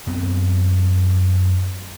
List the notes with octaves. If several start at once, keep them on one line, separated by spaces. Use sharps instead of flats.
F#2 B3 C4